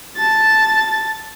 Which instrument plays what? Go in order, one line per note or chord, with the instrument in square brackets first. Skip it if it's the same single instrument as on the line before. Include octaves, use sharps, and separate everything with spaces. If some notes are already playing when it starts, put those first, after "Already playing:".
[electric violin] A5 A6